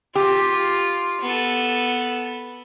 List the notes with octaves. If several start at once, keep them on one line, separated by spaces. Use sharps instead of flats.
F4 G4
B3 A4